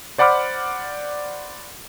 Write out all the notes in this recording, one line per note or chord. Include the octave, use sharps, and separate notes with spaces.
C5 D5 F#5 B5 D6 F6